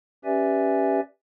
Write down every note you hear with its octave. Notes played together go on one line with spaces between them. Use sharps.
C#4 G4 B4 D5 E5 G#5